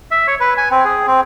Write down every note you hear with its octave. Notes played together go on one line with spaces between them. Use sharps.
E5
C#5
B4
G#5
C4
G#4
C4